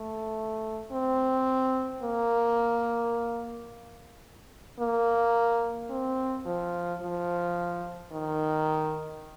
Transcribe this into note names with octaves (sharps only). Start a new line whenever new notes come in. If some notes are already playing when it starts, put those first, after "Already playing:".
Already playing: A3
C4
A#3
A#3
C4
F3
F3
D#3